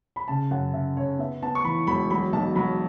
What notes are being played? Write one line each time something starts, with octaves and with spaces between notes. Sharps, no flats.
B5
C#3 A5
F#2 F#5
C#3 E5
C#3 C#5
B3 E5
B3 A5
C#6
E3 B5
E1 B5
F#3 B5
B1 A5
F#3 B5